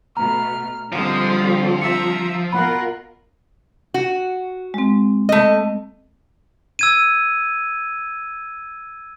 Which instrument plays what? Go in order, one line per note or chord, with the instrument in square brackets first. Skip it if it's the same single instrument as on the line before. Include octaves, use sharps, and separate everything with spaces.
[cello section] B2 A3 [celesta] A#5 [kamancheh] F6
[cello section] D3 G3 C4 [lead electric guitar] F3 [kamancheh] G#3 D#6
[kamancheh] E5 A#5 [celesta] C#7
[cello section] B2 F4 A#4 [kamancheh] F#5 F#6 [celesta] B5
[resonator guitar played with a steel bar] F#4
[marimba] G#3 C4
[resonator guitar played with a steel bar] A3 D#5
[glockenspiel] E6 G#6 D#7